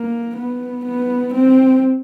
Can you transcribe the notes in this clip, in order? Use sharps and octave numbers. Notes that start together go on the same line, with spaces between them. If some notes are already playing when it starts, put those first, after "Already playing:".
Already playing: A#3
B3
B3
C4